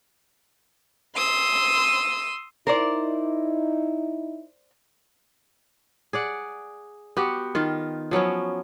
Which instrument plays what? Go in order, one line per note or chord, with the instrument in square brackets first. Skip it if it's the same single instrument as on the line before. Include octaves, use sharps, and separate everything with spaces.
[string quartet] C6 D#6 E6
[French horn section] D#4 E4 [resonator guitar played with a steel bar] A#4 C5 D5
[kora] G#4 D5 F#5
B3 F#4 G4
D#3 F4
F3 F#3 B3 C#4